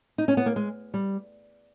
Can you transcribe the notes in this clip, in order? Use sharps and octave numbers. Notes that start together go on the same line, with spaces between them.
D#4
C#4
B3
A#3
G#3
G3